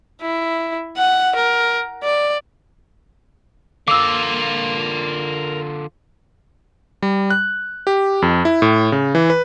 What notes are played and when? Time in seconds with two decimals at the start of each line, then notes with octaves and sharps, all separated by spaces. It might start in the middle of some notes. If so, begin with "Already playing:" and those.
0.21 E4
0.97 F#5
1.36 A#4
2.03 D5
3.88 D3 F4 A#4 F5 D6 E6
7.02 G3
7.30 F#6
7.87 G4
8.22 F2
8.45 E4
8.62 A2
8.92 C#3
9.15 E3
9.30 B4